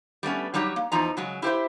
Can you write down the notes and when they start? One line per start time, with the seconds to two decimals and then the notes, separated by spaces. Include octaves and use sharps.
0.23 G3 A3 B3 C#4
0.54 F#3 G3 D#4 G4 C#5
0.76 A#3
0.92 E2 F3 D#4 A#5
1.17 C#3 F#3 G#3
1.42 E4 G4 C5 E5